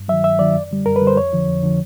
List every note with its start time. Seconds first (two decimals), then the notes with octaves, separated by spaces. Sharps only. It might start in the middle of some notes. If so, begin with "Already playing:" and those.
Already playing: G2
0.08 F#3 E5
0.12 D#3
0.24 G2 E5
0.39 D#3 F#3 D5
0.55 F#2
0.71 D3 G3
0.86 F#2 A#4
0.96 B4
1.02 D3 G3
1.07 C5
1.17 F2 C#5
1.33 D3 F3
1.48 F2
1.63 D3 F3